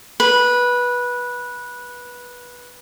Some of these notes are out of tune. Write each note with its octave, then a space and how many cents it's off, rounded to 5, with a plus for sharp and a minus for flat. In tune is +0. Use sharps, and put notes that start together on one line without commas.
B4 -15